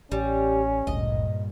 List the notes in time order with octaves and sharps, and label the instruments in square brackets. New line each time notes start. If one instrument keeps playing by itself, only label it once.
[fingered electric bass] A1 [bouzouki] G3 [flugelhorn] C#4
[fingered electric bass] G#1 D2 [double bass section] G2 A#2 [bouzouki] D#5